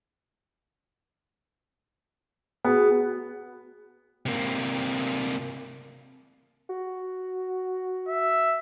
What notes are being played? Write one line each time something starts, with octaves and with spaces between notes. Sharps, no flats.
B3 F#4 G#4
C3 A#3
F#4
E5